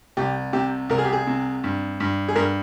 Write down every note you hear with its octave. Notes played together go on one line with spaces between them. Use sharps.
C2 G4
C3 G4
C2 A#4
G#4
G4
G#4
C3
G2
G2
G#4
G2 A#4